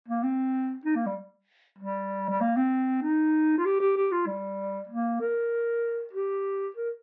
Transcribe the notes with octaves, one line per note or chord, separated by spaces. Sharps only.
A#3
C4
D#4
A#3
G3
G3
G3
A#3
C4
D#4
F4
G4
G4
G4
F4
G3
A#3
A#4
G4
A#4